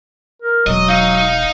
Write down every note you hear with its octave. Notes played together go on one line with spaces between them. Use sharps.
A#4
E1 F#3 D#5
D#4 F5